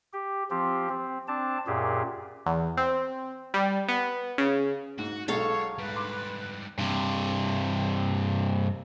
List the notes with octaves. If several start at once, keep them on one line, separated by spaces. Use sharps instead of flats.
G4
F3 C4 G4
C4
C4 D4 A5
F#2 A#2 G4 G#4
E2
C4
G3
B3
C#3
G#2 F#4
B1 G#3 A4 C#5 F5 C#6
G#2 G3 B4
C6 D6
G2 C3